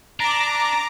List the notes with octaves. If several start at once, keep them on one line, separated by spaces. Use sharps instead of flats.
D4 A#5 D6